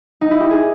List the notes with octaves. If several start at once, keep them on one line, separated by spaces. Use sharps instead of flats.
D#4
E4
G4
G#4